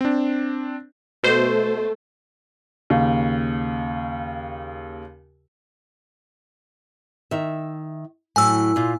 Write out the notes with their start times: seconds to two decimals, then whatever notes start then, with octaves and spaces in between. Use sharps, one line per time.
0.01 C4 D4
1.23 B2 A3 C5
2.90 D#2 C#3
7.31 D#3 E5
8.36 A2 F#3 G#5 E6
8.76 A#2 F4